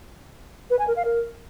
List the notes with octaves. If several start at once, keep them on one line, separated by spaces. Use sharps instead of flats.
B4
G#5
A#4
F5
A#4